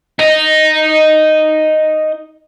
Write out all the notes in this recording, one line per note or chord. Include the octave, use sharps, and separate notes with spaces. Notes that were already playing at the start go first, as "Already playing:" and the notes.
D#4 D#5